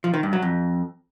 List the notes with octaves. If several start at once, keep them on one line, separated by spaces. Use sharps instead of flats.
F3
D#3
G2
F#3
F2